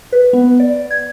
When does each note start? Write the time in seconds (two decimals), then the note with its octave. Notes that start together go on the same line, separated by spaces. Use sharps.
0.12 B4
0.33 B3
0.60 D5
0.91 G#6